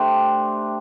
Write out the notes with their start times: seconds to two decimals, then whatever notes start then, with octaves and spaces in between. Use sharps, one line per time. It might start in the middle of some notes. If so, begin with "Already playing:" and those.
Already playing: A3 D4 G4 C5